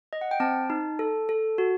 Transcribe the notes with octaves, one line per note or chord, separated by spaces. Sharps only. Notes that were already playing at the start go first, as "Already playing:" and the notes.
D#5
F#5
G5
C4 A5
D#4
A4
A4
F#4